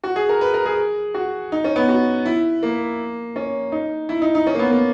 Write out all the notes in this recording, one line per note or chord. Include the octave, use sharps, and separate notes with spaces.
F#4
G#4
A#4
B4
A#4
G#4
F#4
D#4
C#4
B3
F#4
E4
A#3
C#4
D#4
E4
D#4
D#4
C#4
A#3
B3
A#3